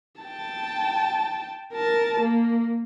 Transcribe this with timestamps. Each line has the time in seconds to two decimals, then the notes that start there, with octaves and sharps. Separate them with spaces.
0.22 G5 A5
1.73 A#4 A5
2.20 A#3